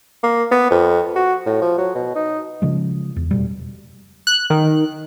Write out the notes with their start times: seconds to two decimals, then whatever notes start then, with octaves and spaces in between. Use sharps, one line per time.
0.23 A#3
0.51 B3
0.71 F2
1.16 F#4
1.46 A2
1.62 F3
1.78 F#3
1.95 B2
2.15 D#4
2.62 C#3 F3 G#3
3.16 E2
3.31 F1 B2 G3
4.27 F#6
4.50 D#3